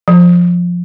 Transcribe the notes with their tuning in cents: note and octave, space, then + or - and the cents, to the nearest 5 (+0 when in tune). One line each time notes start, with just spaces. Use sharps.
F3 +10